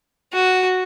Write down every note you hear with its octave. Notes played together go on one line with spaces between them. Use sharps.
F#4